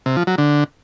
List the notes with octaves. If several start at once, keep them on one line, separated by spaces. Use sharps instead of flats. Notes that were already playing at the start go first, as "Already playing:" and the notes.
C3
F3
F#3
D3